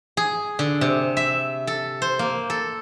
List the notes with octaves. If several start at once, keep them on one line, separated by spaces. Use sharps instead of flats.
G#4
D3
C3
E5
A4
C5
A#3
A4